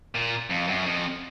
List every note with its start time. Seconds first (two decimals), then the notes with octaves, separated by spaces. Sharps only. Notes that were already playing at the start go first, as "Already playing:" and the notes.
0.15 A#2
0.50 F2
0.67 F#2
0.86 F2